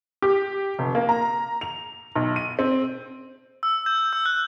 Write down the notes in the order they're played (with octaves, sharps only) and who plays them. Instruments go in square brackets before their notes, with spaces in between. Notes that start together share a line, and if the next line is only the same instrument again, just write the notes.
[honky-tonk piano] G4
F1
A#3
A#5
F7
B1
D#7
C4
[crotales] E6
G6
E6
F#6